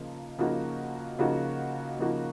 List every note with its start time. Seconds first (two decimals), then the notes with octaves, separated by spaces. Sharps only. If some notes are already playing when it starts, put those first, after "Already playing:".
Already playing: C#3 F3 A#3 D#4
0.38 C#3 F3 A#3 D#4 F#4
1.19 C#3 F3 A#3 D#4 F#4
1.99 C#3 F3 A#3 D#4 F#4